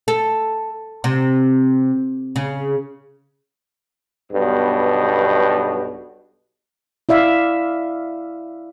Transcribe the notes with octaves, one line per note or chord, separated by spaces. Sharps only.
A4
C3
C#3
B1 G2 B2 B3
E4 D5 E5 F5